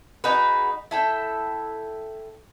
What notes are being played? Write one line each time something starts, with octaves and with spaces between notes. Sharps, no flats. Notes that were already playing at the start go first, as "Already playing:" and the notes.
D#4 F#4 G#4 B4
E4 A4 G5